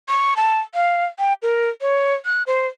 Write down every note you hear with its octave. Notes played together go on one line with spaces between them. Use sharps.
C#6
A5
F5
G5
A#4
C#5
F#6
C5